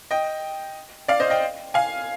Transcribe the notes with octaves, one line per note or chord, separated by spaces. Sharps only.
D#5 G5
D5 F5
C5 D#5
D#5 G5
F5 G#5